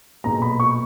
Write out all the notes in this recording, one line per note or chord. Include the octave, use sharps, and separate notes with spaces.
B1 A#2 G#3 B3 A#5
B5
C#6